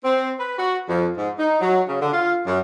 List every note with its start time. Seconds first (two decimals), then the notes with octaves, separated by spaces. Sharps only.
0.05 C4
0.40 B4
0.58 F#4
0.89 F2
1.17 G#2
1.38 D#4
1.61 F#3
1.88 C#3
2.01 D3
2.13 F4
2.47 F#2